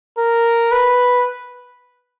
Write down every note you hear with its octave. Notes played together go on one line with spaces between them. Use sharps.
A#4
B4